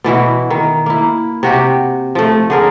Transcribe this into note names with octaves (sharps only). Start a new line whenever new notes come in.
B2 E3 E4 F#4
D#3
A#3 E4
C3 F#4 G4
F3 A3
D3 G#4 A#4